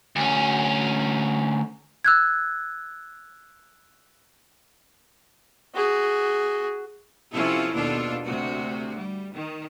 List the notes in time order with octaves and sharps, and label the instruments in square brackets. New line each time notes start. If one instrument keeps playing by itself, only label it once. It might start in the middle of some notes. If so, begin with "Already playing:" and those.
[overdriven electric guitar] D2 C#4
[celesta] E6 F#6 G#6
[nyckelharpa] F#4 G#4
[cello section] C3 F3 C#4 E4 F4 A4
D#2 B2 D4 F4 A4
D2 C3 F#4
G3
D#3